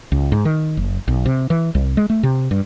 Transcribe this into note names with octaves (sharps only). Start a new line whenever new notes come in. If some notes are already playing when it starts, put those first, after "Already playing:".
C#2
G#2
D#3
F#1
B1
C3
E3
C2
G#3
A3
C3
G2